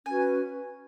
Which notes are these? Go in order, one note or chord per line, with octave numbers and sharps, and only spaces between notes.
C#4 F#4 B4 G#5